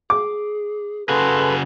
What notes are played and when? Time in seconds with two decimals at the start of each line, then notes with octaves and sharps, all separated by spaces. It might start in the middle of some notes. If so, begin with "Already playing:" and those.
0.10 G#4 D6
1.09 C#3 F#4 G#4 A4 B4 C6